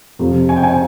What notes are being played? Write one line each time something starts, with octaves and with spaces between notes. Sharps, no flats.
F2 C3 F3
G#5
G5
G#5